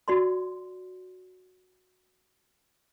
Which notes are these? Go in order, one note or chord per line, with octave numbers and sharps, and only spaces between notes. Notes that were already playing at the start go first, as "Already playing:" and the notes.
F#4 D5 C6